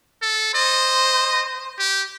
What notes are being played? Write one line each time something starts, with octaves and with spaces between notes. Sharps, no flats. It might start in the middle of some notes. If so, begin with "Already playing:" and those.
A4
C5 D#5
G4